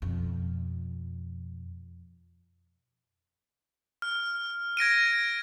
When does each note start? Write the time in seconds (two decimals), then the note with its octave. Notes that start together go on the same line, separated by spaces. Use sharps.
0.02 F2 B2
4.02 F6
4.77 G#6 A#6 D7 D#7